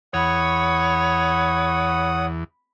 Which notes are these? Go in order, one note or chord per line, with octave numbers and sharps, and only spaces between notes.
E2 C#5 F#5 B5 D#6